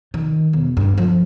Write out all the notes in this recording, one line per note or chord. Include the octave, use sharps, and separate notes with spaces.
D#3
E1
G2
F3